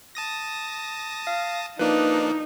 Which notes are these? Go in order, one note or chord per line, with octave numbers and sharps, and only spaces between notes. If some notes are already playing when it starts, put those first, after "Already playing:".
A5 D#6 A#6
F5
F3 A#3 D4 D#4 B4